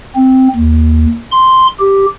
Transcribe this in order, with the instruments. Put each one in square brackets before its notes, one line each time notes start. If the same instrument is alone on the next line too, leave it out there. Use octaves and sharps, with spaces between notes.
[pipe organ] C4
D#2
C6
G4